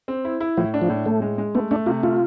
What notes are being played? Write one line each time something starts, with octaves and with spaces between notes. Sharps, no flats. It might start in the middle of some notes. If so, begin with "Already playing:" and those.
C4
E4
E4
A2 F3
D4
F3
A2
A2 A3
G#3
G#3
A3 B3
A3 D4
C3 F4
A3 F4